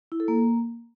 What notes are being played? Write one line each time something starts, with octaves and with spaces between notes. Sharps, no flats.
E4
A4
A#3